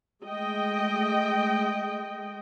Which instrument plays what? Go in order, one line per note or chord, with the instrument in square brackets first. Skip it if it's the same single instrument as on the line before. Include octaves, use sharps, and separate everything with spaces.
[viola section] G#3 A3 D#5 G5